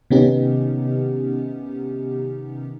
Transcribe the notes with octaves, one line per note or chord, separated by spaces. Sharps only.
C3 D#3 B3 C#4 D#4 G4